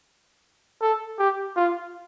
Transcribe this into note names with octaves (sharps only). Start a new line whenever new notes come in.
A4
G4
F4